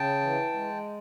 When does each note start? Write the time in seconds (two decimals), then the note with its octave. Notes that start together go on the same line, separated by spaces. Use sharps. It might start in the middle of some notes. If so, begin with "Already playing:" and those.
Already playing: C#3 G5 A5
0.21 E3
0.53 G#3